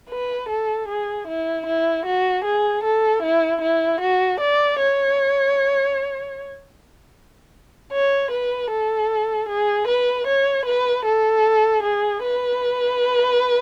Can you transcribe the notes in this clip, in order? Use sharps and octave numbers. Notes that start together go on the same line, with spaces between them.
B4
A4
G#4
E4
E4
F#4
G#4
A4
E4
E4
F#4
D5
C#5
C#5
B4
A4
G#4
B4
C#5
B4
A4
G#4
B4